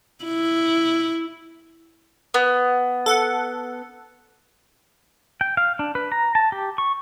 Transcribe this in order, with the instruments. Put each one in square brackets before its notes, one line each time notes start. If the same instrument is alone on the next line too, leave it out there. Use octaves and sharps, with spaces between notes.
[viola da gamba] E4
[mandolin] B3
[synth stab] A4 F#5
[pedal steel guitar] G5
F5
D4
B4
A#5
A5
G4
C#6